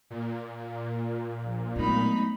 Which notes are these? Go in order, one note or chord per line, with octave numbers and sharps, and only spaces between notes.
A#2
A#1
F#3 G#3 A3 B3 D#4 B5